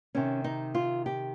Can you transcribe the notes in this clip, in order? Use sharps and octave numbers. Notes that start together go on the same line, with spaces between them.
C3 D#3 C#4
D#4
F4
G4